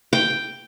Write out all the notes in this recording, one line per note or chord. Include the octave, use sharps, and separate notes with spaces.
G5